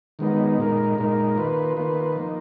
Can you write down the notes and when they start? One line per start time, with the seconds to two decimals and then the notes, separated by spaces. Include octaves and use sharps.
0.19 D#3 G#3 B3 D#4
0.58 A#2 G#3 D#4 A#4
0.98 A#2 G#3 D#4 A#4
1.37 D#3 A#3 F4 B4
1.77 D#3 A#3 F4 B4
2.16 F3 A#3 D#4